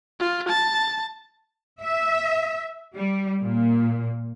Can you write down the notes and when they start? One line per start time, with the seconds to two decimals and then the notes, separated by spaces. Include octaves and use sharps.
0.20 F4
0.49 A5
1.81 E5
2.95 G3
3.42 A#2